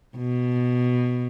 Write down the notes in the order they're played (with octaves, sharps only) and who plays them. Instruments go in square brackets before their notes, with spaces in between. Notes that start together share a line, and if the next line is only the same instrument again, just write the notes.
[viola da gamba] B2